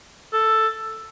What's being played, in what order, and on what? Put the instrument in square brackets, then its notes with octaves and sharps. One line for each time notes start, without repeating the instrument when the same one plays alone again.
[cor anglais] A4